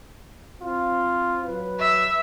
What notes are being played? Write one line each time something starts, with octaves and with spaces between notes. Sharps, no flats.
C4 F4
F#3 B4
E5